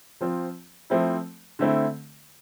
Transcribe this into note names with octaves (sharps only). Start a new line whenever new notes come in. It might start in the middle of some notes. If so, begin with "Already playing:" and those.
F3 C4 F4
F3 A3 C4 E4
D3 A3 C4 E4